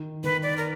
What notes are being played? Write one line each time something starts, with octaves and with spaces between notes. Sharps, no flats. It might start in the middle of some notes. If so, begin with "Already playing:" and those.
Already playing: D#3
D#3 B4
D5
A#4